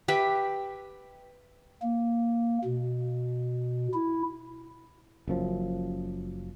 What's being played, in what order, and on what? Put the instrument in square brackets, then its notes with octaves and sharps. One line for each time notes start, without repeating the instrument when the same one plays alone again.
[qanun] G4 B4 E5 G5
[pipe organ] A#3
B2
E4
[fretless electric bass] F#1 F#2 F3